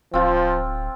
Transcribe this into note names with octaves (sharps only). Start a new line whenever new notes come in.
D1 F3 C4 F4